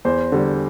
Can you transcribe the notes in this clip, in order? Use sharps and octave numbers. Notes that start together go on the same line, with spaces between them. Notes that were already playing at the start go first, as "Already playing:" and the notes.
E2 C5
D3 G3